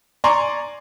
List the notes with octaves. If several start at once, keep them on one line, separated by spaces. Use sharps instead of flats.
D5 G#5 A#5 C6 C#6